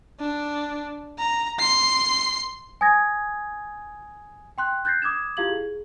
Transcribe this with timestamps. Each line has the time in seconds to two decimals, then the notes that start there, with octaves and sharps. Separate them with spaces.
0.20 D4
1.19 A#5
1.59 C6 C7
2.81 G#5 D#6 G#6 A#6
4.58 G5 C6 F#6
4.85 F#6 G6 A6 A#6 C7
5.02 D6 D#6 G#6 E7
5.37 E4 F4 G4 F5 G#6 F#7
5.49 G#4